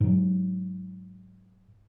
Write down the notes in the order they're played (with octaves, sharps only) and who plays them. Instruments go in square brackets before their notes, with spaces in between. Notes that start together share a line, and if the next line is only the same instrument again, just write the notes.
[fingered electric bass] G#2 F#3